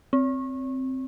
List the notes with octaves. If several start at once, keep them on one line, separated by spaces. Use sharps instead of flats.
C4